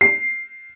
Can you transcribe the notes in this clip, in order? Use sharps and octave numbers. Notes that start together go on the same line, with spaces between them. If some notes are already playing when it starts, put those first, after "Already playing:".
C7